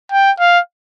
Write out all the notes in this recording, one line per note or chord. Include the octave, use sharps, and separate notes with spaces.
G5
F5